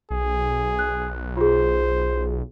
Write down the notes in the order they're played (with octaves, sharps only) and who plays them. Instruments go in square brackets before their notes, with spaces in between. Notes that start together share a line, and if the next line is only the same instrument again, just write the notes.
[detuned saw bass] B1 [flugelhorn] G#4
[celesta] F#6
[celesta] F4 G#4 [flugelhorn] C5